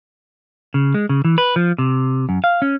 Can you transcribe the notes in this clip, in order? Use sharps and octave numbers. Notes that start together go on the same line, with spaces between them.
C#3
G#3
C#3
E3
B4
F3
C3
F#2
F5
C#4